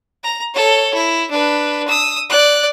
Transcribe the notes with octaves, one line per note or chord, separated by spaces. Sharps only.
A#5
A4 C#5
E4
D4 B4
D#6 E6
D5 F#6